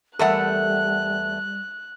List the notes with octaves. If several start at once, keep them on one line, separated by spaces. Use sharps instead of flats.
E2 G3 A3 A4 A#4 E5 F#5 F#6